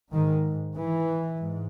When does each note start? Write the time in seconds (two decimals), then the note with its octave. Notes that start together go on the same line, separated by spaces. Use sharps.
0.12 G#2 D#3
0.75 E3
1.39 G#2